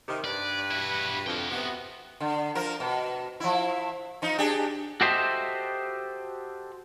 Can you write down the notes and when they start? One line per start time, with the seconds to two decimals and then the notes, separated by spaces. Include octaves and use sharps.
0.08 C3 D#3
0.24 G2 B4 D5
0.71 E4 F#4
1.27 F2 F#4 G5
1.50 C3 B3
2.20 D3
2.55 F3 A#4
2.80 B2
3.40 F3 E4
4.22 F3 D#4
4.38 D4 G4 G#4
5.01 F#4 G4 A4 C5 D#5 E5